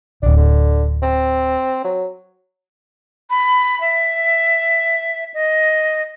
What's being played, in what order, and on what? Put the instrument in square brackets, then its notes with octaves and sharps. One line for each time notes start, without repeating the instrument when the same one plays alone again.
[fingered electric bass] D1 G#1 [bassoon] D4
[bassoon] D3
C4
F#3
[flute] B5
E5
D#5